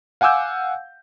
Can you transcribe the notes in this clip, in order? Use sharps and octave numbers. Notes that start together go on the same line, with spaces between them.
F5 F#5 G#5 D6 E6 G6